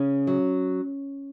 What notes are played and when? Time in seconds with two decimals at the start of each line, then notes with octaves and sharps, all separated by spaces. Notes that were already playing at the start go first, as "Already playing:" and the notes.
Already playing: C#3 C#4
0.27 F#3